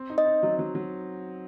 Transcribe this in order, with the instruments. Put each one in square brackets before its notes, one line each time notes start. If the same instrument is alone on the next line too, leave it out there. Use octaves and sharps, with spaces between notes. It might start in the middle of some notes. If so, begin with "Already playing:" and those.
Already playing: [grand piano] C4
D#4
[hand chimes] D#5
[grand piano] D#4
F#3
F#3
F#3